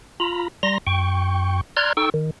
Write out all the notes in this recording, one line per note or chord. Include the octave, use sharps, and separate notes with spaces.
F4 A#5 B5
G3 A#5 C6 A#6
F#2 G5 C#6
D5 A#5 C6 F6 F#6 G#6
D#4 A4 G5 C#6 E6
D#3